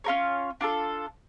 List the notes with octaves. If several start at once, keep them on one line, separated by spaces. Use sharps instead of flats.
C#4 F4 A#4 C#5
D4 F4 A4